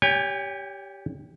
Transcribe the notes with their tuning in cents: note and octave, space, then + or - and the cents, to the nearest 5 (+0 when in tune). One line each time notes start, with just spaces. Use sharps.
G4 +0 C#5 +30 G#5 -45